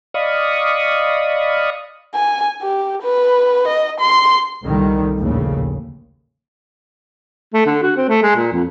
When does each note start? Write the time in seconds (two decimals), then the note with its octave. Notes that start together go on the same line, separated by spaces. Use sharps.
0.14 D5 D#5 F5 B5 C#6 D#6
2.15 G#5
2.62 G4
3.03 B4
3.67 D#5
4.00 C6
4.64 C2 A#2 D3 D#3 G3
5.18 A#1 D#2 A2 C#3
7.54 A3
7.66 D3
7.82 F#4
7.97 C4
8.08 A3
8.23 G#3
8.36 A#2
8.53 F2